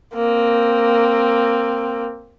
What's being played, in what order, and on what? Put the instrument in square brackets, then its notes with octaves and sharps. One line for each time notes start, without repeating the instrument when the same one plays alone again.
[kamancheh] A#3 C4